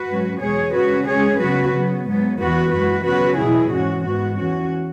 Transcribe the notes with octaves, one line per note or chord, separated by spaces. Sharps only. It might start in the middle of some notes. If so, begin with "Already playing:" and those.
Already playing: F#4 B4
G#2 F#3 C#4
E2 B2 G#3 G#4 C#5
C#3 G#3 C#4 F#4 B4
C#3 G#3 C#4 G#4 C#5
C#3 F#3 B3 F#4 B4
C#3 F#3 B3
G#2 F#3 B3
E2 E3 B3 F#4 B4
F#2 E3 G#3 F#4 B4
C#3 F#3 B3 F#4 B4
E2 B2 F#3 E4 G#4
G#2 E3 C#4 F#4
G#2 E3 B3 F#4
E2 E3 C#4 F#4